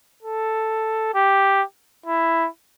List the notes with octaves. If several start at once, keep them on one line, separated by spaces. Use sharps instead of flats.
A4
G4
E4